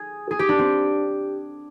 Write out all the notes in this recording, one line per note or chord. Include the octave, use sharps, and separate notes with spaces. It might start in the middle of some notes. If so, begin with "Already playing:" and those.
Already playing: G#4
G#4
G4
D4
C4